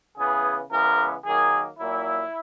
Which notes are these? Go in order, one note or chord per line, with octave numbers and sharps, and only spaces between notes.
C#3 E3 B3 G#4
C#3 E3 G#3 B3 A#4
D#3 F#3 A#3 G#4
A#2 F#3 A#3 E4